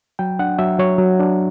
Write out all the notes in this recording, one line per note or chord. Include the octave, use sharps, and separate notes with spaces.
F#3 G5
D4 F#5
F#3 E5
F#3 C#5
F#3
D4